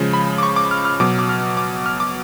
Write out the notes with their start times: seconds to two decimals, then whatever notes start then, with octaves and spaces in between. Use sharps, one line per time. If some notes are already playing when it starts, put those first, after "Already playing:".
Already playing: C#3 F3 G#3
0.13 B5
0.38 D6
0.43 C#6
0.56 D6
0.71 F6
0.85 F6
1.00 B2 F#3 D6
1.19 D6
1.29 F6
1.57 D6
1.86 F6
2.00 D6